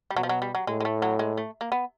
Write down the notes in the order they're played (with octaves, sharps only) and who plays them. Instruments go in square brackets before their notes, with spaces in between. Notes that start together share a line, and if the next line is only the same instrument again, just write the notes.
[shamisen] G3
[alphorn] B2 [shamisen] F#3
[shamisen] F3
F#3
G3
F#3
[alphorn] A2 [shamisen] G#3
[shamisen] G#3
A3
F#3
G#3
A3
A#3
B3